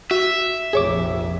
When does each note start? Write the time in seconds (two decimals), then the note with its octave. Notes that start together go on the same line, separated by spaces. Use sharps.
0.11 F#4 E5
0.73 F1 A#1 F2 G#4 C#5 D6